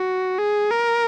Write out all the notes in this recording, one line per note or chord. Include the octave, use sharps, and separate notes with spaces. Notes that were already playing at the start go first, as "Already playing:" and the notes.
Already playing: F#4
G#4
A#4